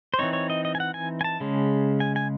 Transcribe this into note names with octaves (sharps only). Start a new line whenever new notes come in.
C5
E3 C4 D#4 C#5
C#5
D#5
D#5
G#5
F#5
G#5
G#5
A5
C#3 G#3 C#4
G#5
G#5